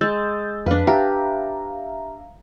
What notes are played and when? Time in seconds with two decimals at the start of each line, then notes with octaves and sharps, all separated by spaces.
0.01 G#3 E6 G6 A6
0.66 F2 D4 B4 F5
0.87 G4 E5 F5 A#5